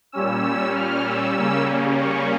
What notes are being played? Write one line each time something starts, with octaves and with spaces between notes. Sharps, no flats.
A#2 G3 C#4 E6
F6
E6
C#3 G3 A#3 C#4
C#6